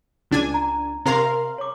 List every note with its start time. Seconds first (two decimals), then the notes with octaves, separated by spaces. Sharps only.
0.31 C#2 D4 G#5
0.54 A#5
1.06 C3 A#4 F5 A#5 C6
1.58 C#5 D6